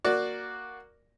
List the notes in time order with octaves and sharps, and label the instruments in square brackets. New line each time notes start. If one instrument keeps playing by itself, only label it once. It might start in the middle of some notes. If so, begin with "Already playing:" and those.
[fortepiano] A#3 F#4 D5